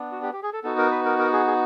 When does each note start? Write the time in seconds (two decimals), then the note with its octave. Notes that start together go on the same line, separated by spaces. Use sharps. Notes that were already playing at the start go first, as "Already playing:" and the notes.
Already playing: B3 D4
0.12 F#4
0.22 G4
0.33 G4
0.43 G#4
0.53 A4
0.64 B3 D#4 F#4 A4
0.78 A#4
0.91 B4
1.05 A#4
1.19 A#4
1.33 G#4
1.46 G#4